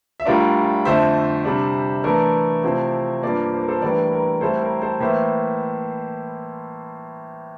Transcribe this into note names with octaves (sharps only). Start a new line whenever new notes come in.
E5
A2 G3 D4 F4 A#4 D5
F2 D3 A3 C5 E5
C3 G3 D4
E3 A3 D4 A#4 D5
C3 F3 A3 C4 E4
G2 F3 A#3 A#4 D5
C5
A#4
A4 C5
A2 E3 G3 D4 A#4 D5
A#4
A2 G3 C4 E4 A4 C5
A#4
A4 C5
A2 E3 A#3 C5 E5